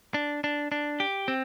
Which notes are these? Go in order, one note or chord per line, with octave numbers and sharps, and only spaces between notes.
D4
D4
D4
G4
C4